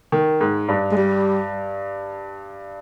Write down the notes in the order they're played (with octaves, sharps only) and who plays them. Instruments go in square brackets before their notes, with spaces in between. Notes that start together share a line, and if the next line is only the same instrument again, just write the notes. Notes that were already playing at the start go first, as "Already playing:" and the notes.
[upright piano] D#3
G#2
G2
[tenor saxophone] G#3
G3